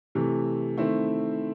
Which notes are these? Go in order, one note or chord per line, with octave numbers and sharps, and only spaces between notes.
C3 E3 A3
D#3 A3 C4 E4